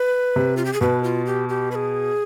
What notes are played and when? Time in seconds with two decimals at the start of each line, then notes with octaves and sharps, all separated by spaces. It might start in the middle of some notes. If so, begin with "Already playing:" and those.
Already playing: B4
0.36 C3
0.57 F4
0.65 G4
0.73 G#4
0.81 B2 B4
1.04 F4
1.26 G4
1.49 G4
1.71 B4
1.75 G#4